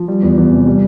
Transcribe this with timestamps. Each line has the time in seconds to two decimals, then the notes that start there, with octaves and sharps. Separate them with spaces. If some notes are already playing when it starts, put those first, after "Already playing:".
Already playing: F3
0.08 G3
0.22 E2
0.37 E2
0.52 C3
0.66 G3